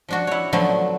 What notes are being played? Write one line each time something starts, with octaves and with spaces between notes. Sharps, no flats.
F3 D4 F#4
E4 C#5
D3 F3 F#3 A3 B3